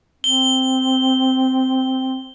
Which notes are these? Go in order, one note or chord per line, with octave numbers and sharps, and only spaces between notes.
C4 G7